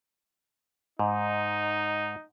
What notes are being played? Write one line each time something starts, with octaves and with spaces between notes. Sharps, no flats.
G#2 D#4